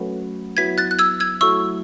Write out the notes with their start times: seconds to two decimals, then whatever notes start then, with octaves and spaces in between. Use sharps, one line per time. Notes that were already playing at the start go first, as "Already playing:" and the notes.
Already playing: F#3 A3 C#4 F#4 B4
0.57 F#3 B3 E4 G#6 B6
0.78 F#6 A6
0.91 F#6
0.99 E6 G#6
1.20 E6 G#6
1.41 F#3 A3 E4 C#6 E6